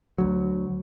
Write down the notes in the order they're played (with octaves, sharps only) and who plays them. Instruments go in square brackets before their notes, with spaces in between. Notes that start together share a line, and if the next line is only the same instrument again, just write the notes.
[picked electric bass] D2 F#3